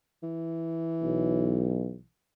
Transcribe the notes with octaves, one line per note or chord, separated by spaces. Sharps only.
E3
B1